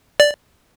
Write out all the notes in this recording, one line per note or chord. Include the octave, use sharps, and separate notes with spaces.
D5